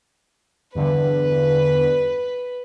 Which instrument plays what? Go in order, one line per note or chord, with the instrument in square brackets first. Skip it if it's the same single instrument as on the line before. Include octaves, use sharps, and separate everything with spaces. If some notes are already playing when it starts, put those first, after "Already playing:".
[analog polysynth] E2 G2 D3 [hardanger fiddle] B4